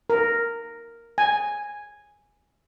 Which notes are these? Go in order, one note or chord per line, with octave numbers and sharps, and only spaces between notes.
A#4
G#5